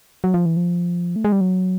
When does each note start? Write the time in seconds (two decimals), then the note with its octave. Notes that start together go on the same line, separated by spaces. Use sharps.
0.24 F#3
0.34 F3
0.46 E3
0.57 F3
1.16 A3
1.25 G#3
1.32 G3
1.41 F#3